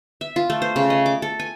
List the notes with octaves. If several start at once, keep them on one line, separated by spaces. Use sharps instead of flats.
E5
F4
A3
C5
C#3
D#5
D6
A4
G#5